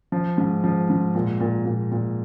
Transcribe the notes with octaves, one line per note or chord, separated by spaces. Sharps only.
F3
G#2
F3
G#2
A#2
A#2
A#2
A#2